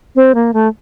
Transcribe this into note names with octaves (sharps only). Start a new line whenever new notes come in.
C4
A#3
A3